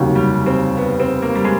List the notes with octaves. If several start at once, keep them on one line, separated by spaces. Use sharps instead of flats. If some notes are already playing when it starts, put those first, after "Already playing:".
Already playing: F1 D#2 C#3 F#3
G3
C4
B3
C4
A#3
G3
G#3